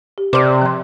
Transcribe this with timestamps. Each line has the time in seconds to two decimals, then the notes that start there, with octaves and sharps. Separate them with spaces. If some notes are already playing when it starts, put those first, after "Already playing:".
0.18 G4
0.33 C3 C5 D5 D6 F6
0.61 F3 C6